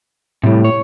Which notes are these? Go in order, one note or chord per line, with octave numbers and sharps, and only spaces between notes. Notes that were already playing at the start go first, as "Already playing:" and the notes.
A2 C3 G3
C#5